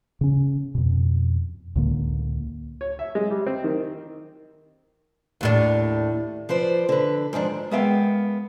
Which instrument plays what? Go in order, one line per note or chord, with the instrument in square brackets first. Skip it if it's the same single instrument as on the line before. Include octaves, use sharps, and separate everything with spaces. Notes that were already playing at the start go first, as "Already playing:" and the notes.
[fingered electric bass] C#3 C#4
F2 B2
C#2 A2 D3 A#3
[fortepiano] C#5
E5
G#3
G3
C4
D#3
[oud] D#2 A2 D4
[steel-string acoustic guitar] F3 B4 C5 D5
D3 B4
G#2 D#3 F3 D4
[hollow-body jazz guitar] G#3 A#3 B3 E5 F5 G5